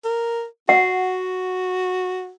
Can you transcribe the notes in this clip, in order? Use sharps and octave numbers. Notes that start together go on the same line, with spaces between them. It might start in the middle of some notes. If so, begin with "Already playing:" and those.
A#4
F#4 F#5